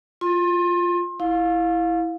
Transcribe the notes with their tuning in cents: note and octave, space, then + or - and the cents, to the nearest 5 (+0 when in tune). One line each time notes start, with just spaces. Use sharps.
F4 +0 C6 +30
E4 +0 F5 +20